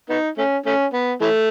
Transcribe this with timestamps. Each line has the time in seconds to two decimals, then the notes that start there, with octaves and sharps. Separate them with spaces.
0.09 B3 D#4
0.38 A3 C#4
0.66 A3 C#4
0.93 B3
1.21 E3 A3